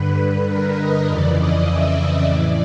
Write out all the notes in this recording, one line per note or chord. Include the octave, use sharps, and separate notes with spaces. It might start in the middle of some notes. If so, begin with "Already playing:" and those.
Already playing: G2 D3 B4
A#4
D#5
F2 C#3 E3 D5
D#5
E5
D#5
A2 E3 D5